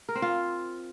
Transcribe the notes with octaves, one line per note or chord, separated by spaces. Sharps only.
A#4
C4
F4